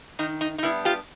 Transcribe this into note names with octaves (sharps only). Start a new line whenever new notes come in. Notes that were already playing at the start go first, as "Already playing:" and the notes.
D#3 D#4
D#4
D#4
G3 B3 D4 E4
F4 G4